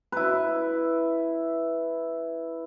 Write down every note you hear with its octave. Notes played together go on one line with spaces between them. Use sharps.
E4 B4